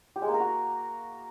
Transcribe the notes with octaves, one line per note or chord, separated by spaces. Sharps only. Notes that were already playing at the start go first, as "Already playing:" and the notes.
G4
G#3
A#3
A#4
F#4